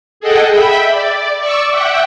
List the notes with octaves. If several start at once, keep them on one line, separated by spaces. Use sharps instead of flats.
G#4 A4 D#5 F#5 G5
E5 G5 B5
D5
D5 C#6 D6 E6
E5 F#5 G5